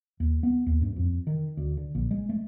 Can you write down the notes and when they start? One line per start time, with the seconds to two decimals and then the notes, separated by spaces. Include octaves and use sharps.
0.20 D#2
0.43 B3
0.67 D#2
0.82 G2
0.96 F2
1.27 D#3
1.57 D2
1.77 D3
1.95 A#1
2.11 G#3
2.29 A3